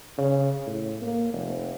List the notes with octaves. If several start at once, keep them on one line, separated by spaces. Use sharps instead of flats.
C#3
A2
A#3
F1